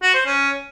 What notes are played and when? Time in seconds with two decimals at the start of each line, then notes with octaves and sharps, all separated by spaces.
0.03 F#4
0.14 C5
0.26 C#4